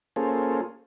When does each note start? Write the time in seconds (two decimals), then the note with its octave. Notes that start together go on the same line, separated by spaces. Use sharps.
0.16 A#3 C#4 F4 G#4 A4 C5